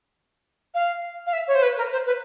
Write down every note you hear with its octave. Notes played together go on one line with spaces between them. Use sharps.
F5
F5
E5
C#5
C5
B4
A#4
C5
B4